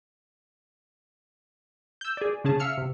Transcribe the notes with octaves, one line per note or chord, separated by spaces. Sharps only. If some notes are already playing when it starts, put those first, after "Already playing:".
E6 G6
G#4 D5
C#3 C#4 G#4 A5
E5 F5 E6 F6 C#7
C3